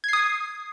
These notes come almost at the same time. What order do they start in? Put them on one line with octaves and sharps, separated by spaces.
G#6 C7 D#6